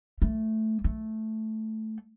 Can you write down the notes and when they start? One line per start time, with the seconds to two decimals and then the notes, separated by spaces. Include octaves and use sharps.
0.22 A3
0.84 A3